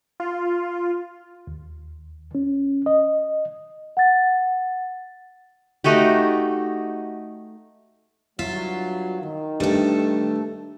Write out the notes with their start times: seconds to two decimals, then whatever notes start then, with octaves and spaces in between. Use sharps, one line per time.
0.20 F4
1.47 D#2
2.35 C#4
2.86 D#5
3.97 F#5 A6
5.84 A3 D#4 F#4 G4
8.39 G2 F#3 F4 E5
9.22 D#3
9.60 G2 A3 A4